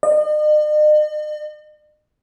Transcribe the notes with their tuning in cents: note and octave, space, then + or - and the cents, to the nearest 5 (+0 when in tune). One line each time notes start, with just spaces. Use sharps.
D#5 -45